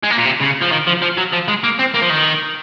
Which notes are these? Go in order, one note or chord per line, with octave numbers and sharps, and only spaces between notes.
G#3
A#3
A#2
C3
C#3
F3
D#3
F3
F3
F#3
F3
G#3
A#3
C4
A#3
F3
D#3